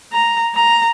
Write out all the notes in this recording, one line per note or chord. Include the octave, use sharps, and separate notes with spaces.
A#5
A#5